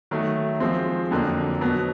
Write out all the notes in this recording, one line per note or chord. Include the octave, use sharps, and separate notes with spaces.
D#3 F#3 A3
F3 G#3 C4
F2 D3 F#3 A#3
B2 F#3 B3